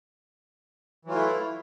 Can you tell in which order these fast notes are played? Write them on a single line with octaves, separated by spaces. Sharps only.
E3 F#3 F4 A3 E4